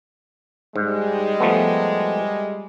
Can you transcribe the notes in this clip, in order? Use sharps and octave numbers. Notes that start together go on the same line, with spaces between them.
G#2 G3 G#3
F3 A3 B3